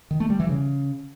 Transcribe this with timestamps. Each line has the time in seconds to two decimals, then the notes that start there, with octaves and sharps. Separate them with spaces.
0.11 D#3
0.20 A3
0.30 G3
0.40 E3
0.49 C#3